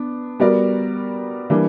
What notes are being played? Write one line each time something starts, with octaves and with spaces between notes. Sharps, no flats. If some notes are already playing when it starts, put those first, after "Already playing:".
Already playing: B3 D4
G3 B3 F#4 A#4 D5
E3 G3 A#3 D4